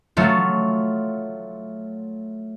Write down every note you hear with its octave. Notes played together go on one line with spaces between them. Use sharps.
F#3 A3 F4